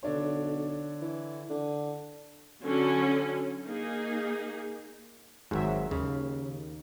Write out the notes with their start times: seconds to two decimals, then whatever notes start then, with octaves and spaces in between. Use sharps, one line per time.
0.03 B1 D3 D4 C#5
1.02 E3
1.50 D3
2.62 D3 F#3 C#4
3.66 A#3 D#4 G#4
5.51 G#1 G#2 F#3 E5
5.91 D#2 C#3